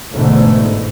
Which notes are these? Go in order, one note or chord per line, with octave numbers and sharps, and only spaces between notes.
G1 G#2 B2 D3 E3 A3